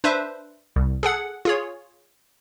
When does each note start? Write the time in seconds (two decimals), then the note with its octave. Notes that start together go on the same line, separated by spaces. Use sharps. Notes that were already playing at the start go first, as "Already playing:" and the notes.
0.04 D4 B4 C5 E5
0.76 C2
1.03 G#4 A4 F#5
1.45 F4 G#4 C#5